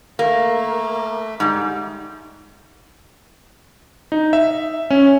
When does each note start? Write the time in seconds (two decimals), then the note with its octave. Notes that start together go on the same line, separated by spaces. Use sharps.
0.19 A3 A#3
1.40 G#2 G3
4.12 D#4
4.33 E5
4.90 C#4